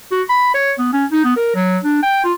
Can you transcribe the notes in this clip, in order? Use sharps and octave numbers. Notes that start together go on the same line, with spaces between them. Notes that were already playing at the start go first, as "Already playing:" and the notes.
F#4
B5
C#5
B3
C#4
D#4
B3
A#4
F#3
D4
G5
F4